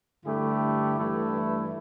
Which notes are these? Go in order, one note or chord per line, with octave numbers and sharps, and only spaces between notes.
G2 D3 A3 E4 G4
G2 E3 A3 E4